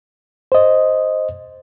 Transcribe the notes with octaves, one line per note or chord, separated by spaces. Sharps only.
C5 D#5